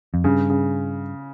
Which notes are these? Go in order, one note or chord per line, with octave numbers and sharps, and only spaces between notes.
F2
G2 C#3
C#3